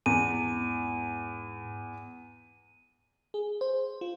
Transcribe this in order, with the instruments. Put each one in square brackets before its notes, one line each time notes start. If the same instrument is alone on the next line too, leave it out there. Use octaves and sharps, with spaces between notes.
[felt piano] E2 [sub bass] G#2 [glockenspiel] D#7
[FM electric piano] G#4
C5
F4